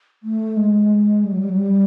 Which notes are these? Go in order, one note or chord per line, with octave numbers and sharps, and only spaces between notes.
A3
G#3
G3
F#3
G3
F#3
G3